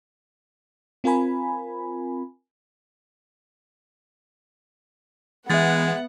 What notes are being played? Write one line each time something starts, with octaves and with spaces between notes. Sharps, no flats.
C4 F4 A#4 G#5 B5
E3 G#3 B3 E5 F#5 A6